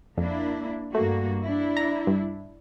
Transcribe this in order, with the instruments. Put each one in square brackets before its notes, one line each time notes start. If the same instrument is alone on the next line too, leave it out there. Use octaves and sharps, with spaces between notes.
[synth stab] F2 [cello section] A#3 D4 E4
[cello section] G2 A#3 F#4 [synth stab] A3
[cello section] D4 E4
[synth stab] A#5
G2